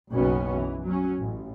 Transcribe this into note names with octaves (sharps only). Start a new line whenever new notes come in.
F#1 B1 B2 B3 C#4
E3
F#3 C#4
A1